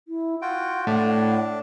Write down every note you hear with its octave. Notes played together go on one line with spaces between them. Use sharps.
E4
F4 F#4 F#5 G5
A2 D4 A5